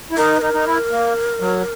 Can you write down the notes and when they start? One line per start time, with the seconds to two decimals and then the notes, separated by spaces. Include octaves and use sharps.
0.11 E4
0.17 D#4 A#4
0.37 B4
0.41 D#4 A#4
0.54 D#4
0.67 E4
0.91 A#3
1.40 F#3